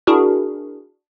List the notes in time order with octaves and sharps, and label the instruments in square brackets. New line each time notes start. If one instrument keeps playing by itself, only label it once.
[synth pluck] D4 E4 F#4 G#4 A#4